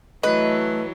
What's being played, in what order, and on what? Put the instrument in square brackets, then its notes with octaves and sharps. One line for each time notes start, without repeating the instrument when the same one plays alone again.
[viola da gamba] E3 F#3 [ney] A3 [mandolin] B4 [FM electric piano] D#5